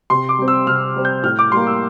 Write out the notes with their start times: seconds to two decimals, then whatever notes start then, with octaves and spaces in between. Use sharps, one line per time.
0.10 C3 C6
0.29 D6
0.38 G3 C4
0.48 E6
0.67 C3 F6
0.96 G3 C4
1.05 G6
1.23 A2 F6
1.39 D6
1.52 G3 A#3 C6
1.67 E6